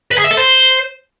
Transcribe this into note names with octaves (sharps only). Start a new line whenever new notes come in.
B4
G#4
E5
A4
C5